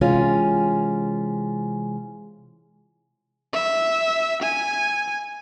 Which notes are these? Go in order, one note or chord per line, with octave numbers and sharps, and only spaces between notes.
C3 E3 G#3 C#4 F4 G#5
E5
G#5